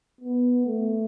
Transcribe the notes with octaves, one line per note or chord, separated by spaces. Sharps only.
B3
A3